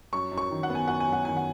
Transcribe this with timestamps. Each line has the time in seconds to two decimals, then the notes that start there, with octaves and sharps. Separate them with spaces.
0.13 F#2 C#6
0.32 F#2
0.38 C#6
0.51 D#3
0.63 F#5
0.70 B3
0.75 G#5
0.87 F#2 F#5
1.00 G#5
1.08 F#2 F#5
1.25 D#3 G#5
1.37 F#5